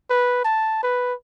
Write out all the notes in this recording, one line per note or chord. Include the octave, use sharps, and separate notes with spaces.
B4
A5
B4